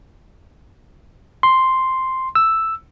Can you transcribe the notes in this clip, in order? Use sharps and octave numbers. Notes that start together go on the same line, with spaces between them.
C6
E6